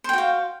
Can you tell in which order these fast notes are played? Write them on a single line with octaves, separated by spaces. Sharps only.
C5 G5 F#4 F5